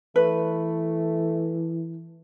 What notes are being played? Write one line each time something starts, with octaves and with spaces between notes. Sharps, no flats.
E3 A3 B4